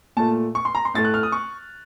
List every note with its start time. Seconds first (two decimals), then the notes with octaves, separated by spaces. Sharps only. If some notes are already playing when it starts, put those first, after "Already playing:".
0.17 A#2 A3 A5
0.55 C#6
0.65 C6
0.75 A#5
0.85 C6
0.94 A2 A3 A6
1.04 F#6
1.14 F6
1.23 D#6
1.32 C#6